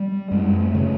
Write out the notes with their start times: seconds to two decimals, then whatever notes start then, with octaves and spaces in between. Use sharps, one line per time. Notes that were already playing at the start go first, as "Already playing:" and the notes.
Already playing: G3
0.31 F#2 G#3
0.60 A3
0.75 C#3